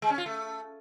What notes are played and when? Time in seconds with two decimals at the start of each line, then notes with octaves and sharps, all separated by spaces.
0.02 G#3
0.10 C#4
0.18 F4
0.26 A3